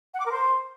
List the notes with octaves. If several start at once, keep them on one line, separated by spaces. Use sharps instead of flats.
F#5
D6
A#4
C5